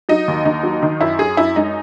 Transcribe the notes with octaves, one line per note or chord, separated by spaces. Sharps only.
F#3 D#4
D#2
D#2 D#4
F#3
D#3 D#4
F#2 E4
F#2 G#4
F#2 E4
G#3 D#4